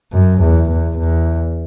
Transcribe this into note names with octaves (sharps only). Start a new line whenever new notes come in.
F#2
E2
E2
E2